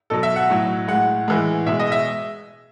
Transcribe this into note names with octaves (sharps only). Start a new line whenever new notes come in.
B2 F#3 A4
E5
F#5
A2 F#3
A2 G#3 F#5
A2 E3 G#3
B2 G#3 E5
D#5
E5